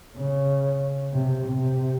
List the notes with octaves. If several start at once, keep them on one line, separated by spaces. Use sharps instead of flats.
C#3
C3
C3